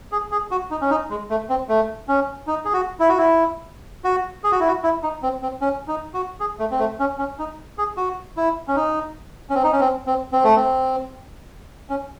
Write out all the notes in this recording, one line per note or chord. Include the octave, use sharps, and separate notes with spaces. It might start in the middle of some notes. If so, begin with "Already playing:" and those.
G#4
G#4
F#4
D#4
C#4
D#4
G#3
A3
C4
A3
C#4
D#4
G#4
F#4
E4
F#4
E4
F#4
G#4
F#4
E4
F#4
E4
D#4
C4
C4
C#4
D#4
F#4
G#4
A3
C4
A3
C#4
C#4
D#4
G#4
F#4
E4
C#4
D#4
C#4
C4
D#4
C#4
C4
C4
C4
A3
C4
C#4